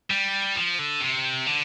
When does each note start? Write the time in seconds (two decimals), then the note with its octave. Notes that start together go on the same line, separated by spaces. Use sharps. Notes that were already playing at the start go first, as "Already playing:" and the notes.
0.10 G3
0.56 F3
0.79 D3
1.01 C3
1.47 D3